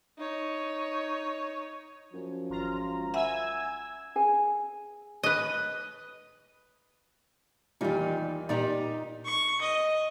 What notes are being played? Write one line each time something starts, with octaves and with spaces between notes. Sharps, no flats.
D#4 C#5
F#2 F3
G#1 F4 A#5
E5 F#5 G#5 B5 E6 G#6
G#4 G#5
B4 D#5
E2 A#2 D#3 G3 D#4
A#2 D#4 G4 D5 A#5
C#6
D#5